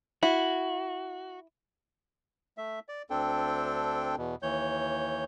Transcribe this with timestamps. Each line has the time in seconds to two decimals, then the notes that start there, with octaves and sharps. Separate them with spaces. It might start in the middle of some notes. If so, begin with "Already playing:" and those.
0.23 E4 F#4
2.58 A3 E5
2.89 D5
3.10 D2 C4 D4 A4 G5
4.17 E2 B2
4.42 D#2 E3 C#5 G6